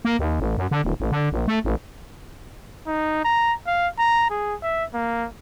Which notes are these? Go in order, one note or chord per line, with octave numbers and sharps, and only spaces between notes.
A#3
D#2
A1
F#2
D3
D#1
A1
D3
A#1
A3
A1
D#4
A#5
F5
A#5
G#4
E5
A#3